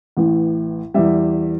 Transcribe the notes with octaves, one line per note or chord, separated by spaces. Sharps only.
A1 A2 E3
E2 E3 G3 E5